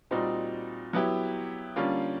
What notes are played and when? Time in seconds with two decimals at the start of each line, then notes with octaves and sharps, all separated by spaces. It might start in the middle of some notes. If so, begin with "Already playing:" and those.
0.11 A#2 G3 C4 D#4 F#4
0.93 F#3 B3 E4 G4
1.76 D3 G3 A#3 C#4 F4